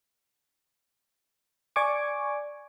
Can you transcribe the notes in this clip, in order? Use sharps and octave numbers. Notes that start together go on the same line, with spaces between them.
D5 G#5 C#6 D6